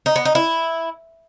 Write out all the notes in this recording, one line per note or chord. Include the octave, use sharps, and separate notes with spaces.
D#4
B3
D#4
E4